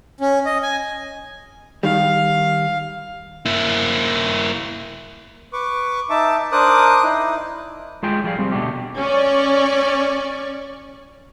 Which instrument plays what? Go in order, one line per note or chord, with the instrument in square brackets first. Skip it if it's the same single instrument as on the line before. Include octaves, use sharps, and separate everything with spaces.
[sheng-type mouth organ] C#4
D#5
G#5
[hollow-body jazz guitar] D#3 G3 [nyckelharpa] F5
[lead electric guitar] A#3 E4
[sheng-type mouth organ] B4 C#6 D6
D#4 E5 A5 D6
D4 A#4 C5 D6 D#6 F#6
D#4 E4
[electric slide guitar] G#3 F4 G#4 G5
F3 G3 G#4 F5
G3 C4
B2 D3 A3 G4
[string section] C#4 D5 C#6